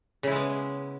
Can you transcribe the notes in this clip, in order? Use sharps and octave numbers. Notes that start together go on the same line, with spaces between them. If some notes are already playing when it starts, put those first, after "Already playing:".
C#3 G#3 B3 E4